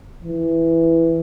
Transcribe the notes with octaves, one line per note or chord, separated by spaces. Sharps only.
E3